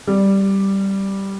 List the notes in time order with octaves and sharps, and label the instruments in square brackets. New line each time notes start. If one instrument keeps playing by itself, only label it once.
[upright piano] G3